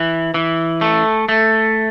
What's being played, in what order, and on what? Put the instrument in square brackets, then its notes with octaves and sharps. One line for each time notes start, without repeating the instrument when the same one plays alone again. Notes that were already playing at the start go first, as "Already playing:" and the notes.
Already playing: [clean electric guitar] E3
E3
A3
A3